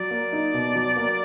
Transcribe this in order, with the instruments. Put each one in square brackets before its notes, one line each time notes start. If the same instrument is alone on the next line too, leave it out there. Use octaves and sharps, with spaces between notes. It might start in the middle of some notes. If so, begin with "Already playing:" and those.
Already playing: [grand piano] F#3 [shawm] D5
[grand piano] A#3
D#4
B2
F#3
A#3